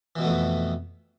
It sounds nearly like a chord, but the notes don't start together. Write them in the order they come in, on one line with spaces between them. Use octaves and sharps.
E3 B2 B3 A3 F2